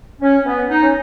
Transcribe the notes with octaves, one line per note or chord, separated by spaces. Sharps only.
C#4
B3
D#4
C#4